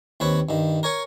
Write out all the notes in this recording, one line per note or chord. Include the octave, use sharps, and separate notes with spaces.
D#2 C4 B4 C#5
G2 D#3
A#4 C#5 G#5 C#6